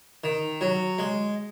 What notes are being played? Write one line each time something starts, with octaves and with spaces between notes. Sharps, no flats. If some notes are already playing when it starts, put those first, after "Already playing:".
D#3
F#3
G#3